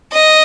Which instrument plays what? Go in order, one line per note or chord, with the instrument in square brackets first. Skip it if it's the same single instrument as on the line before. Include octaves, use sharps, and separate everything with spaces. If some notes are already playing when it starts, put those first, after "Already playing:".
[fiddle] D#5